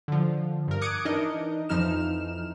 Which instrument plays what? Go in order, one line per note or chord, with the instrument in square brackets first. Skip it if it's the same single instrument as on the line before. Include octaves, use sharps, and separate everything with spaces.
[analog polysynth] D3 F3
G2 A#4
D6 D#6 F#6 G#6 C#7 D7
E3 D4 D#4 A#4 D#5
F2 E3 F3 D#4 F6 E7